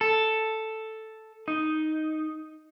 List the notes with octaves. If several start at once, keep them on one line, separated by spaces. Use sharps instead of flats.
A4
D#4